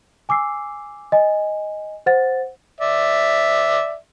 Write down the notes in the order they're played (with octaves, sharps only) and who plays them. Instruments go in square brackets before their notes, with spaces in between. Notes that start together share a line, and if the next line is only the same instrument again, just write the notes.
[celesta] G#5 D6 E6 C7
D#5 G#5
C5 F#5 A6
[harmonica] D5 E5